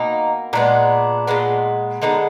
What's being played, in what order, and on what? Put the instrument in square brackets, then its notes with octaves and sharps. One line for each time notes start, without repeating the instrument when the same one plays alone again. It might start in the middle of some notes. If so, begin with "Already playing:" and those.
Already playing: [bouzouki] B2 A#3 D#4
A#2 G#3 B3 D4
A#2 G#3 B3
D3 G#3 B3 D#4